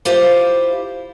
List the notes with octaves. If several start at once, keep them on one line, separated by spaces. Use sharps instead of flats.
E4 F4 G4 C5 F5